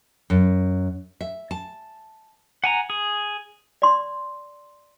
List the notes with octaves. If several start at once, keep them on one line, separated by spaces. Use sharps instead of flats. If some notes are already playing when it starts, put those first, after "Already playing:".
F#2
E5
A5
F#5 G#5 A#5
G#4
D5 C6